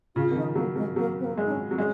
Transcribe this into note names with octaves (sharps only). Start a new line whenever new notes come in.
C#3 F4
D#3
F3 D#4
F#3 A#3
F#3 G#3
F#3 A#3
C4
A#3
G#3
D#4
C#4
F#3
G#3 C#4